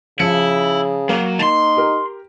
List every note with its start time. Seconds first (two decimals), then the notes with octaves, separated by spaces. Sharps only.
0.20 C#3 F3 E4 C#7
1.09 F#3 A#3
1.39 D#4 A5 C6
1.77 G4 A#4